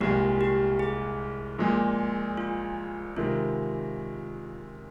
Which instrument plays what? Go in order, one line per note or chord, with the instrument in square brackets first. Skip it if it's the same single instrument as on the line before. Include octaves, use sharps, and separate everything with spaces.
[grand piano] C2 A#2 G#3 [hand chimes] G4
[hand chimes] G4
G#4
[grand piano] A#1 A#2 G#3
[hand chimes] F4
[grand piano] C3 D#3 G#3 [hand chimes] F4